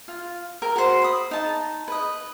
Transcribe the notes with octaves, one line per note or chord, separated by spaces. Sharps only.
F4
A#4 G5
F#4 C5
B5 D#6
D#4 A5
B4 D#5